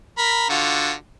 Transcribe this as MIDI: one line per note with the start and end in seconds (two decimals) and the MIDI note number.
0.18 0.46 70
0.18 0.46 83
0.50 0.93 50
0.50 0.93 65
0.50 0.93 66